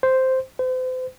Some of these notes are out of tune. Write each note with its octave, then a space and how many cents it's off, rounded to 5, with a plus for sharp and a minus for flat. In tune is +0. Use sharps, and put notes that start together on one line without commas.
C5 -5
C5 -40